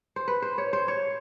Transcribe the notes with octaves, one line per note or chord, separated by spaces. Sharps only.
C5
B4
C5
C#5
C5
C#5